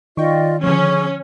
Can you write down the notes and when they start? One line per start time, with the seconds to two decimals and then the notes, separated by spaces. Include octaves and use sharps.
0.17 D#3 F4 D5 D#5 G5 C#6
0.63 D3 F3 C#4 G#4 C#6